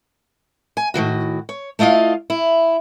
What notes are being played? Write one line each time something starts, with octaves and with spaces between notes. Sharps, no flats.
G#5
A2 D#3 E3 F#4
C#5
A3 E4 F4 D#5 F5
E4